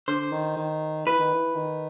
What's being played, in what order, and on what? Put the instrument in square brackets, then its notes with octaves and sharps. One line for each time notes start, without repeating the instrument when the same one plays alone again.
[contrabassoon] D3 [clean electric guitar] C5
[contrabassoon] D#3
D#3
[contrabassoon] E3 [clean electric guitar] B4
[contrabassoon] D#3
E3
D#3